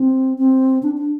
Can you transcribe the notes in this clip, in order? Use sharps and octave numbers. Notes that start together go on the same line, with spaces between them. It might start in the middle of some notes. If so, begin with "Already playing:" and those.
Already playing: C4
C4
D4
D4